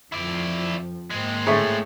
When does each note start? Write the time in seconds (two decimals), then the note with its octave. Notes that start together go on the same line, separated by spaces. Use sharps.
0.12 F2 F3 E4 D5
1.11 G#2 G#3 A#3 C4
1.47 A2 A3 C#4 G#4 E5